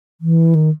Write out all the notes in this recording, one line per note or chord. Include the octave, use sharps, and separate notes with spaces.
E3
D#3